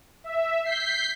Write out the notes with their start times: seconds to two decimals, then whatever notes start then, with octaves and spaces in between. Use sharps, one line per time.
0.24 E5
0.64 G6 B6 C7